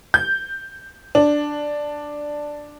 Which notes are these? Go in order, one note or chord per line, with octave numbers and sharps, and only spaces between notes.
G6
D4